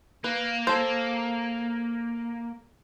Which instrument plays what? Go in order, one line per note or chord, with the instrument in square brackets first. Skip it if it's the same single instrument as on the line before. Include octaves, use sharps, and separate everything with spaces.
[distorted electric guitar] A#3 [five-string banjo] B4
[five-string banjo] A4 C5